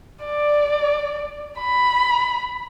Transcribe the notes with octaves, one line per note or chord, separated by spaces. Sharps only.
D5
B5